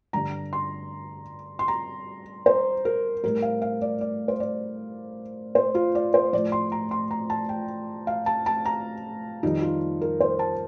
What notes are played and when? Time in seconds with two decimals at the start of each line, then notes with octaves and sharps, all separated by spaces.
0.13 G2 D3 G3 A#5
0.53 C6
1.59 C6
1.68 A#5
2.46 C5
2.85 A#4
3.24 A2 G3 A#4
3.42 F5
3.62 F5
3.82 D5
4.01 D5
4.28 C5
4.40 D5
5.55 C5
5.75 F4
5.95 D5
6.14 C5
6.33 A2 F3 D5
6.52 C6
6.72 A#5
6.91 C6
7.11 A#5
7.30 A5
7.49 G5
8.07 F5
8.26 A5
8.46 A5
8.65 A#5
9.43 F2 D#3 G3 D#4
9.62 F4
10.02 A#4
10.20 C5
10.39 A5